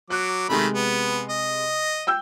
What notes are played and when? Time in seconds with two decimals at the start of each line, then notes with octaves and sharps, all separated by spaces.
0.10 F#3 D6 F#6
0.49 C3 D#3 G#3 A3 B5
0.73 B3
1.30 D#5
2.07 G5 E6 G6